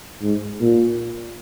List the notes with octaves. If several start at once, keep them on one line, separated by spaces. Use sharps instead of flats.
G#2
A#2